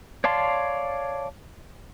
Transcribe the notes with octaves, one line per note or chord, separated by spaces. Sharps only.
C#5 D5 F5 A5 C6